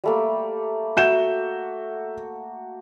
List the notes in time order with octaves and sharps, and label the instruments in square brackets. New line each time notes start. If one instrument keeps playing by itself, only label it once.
[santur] G3 A3 A#3
[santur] F#4 [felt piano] E5 G6 E7